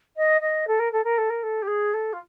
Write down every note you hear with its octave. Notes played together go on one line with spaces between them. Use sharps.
D#5
D#5
A4
A#4
A4
A#4
A4
A#4
A4
G4
G#4
A4
F4